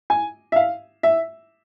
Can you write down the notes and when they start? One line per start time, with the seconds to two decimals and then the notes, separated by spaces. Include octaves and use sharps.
0.10 G#5
0.52 E5
0.56 F5
1.03 E5